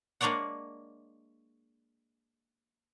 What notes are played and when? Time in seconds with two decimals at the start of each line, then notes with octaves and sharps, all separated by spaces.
0.21 G#3 A#3 D4 C#5 D5 F#5